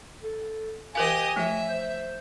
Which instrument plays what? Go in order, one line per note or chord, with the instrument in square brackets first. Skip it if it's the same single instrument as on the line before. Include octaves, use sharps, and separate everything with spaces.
[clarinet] A4
[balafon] E3 A#4 F5 [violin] G4 D#5 [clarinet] G#5
[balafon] F3 A3 [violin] E5
[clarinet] C5